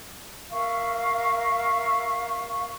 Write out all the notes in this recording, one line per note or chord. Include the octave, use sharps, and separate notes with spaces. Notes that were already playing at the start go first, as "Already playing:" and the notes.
A#4 E5 F5 C#6